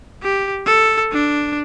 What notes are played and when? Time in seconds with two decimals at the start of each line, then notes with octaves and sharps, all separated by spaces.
0.23 G4
0.66 A4
1.12 D4